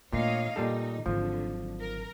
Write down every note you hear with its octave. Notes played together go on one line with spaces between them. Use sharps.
A#2 A3 D4 C#5 D#5 F5
A#2 G3 D#4 A4
G#1 D3 F3 F#3
A#4